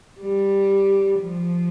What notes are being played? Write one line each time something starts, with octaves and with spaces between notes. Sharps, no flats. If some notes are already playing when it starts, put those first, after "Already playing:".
G3
F3